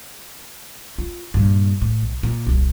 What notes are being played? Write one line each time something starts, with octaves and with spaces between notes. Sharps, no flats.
F4
G2 A#2
A2
B1
A#2
D#1 C2